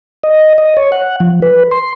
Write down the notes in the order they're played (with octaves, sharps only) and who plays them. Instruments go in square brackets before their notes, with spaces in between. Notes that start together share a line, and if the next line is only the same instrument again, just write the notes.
[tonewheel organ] D#5
D#5
C#5
F#5
F3
B4
C6